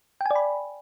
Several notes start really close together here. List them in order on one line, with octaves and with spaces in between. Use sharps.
G5 G#5 D5 B5